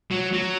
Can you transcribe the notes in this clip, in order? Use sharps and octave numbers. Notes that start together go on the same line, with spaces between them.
F#3
F#3